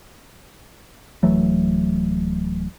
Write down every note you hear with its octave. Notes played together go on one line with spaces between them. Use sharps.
D1 E3 F#3 A3